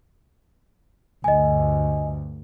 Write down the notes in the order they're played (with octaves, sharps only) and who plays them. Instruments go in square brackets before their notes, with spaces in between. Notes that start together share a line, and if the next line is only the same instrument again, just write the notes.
[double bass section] D2 G2 [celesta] D#5 G#5